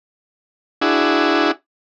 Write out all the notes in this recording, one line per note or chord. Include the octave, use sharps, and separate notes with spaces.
D4 E4 F#4 G#4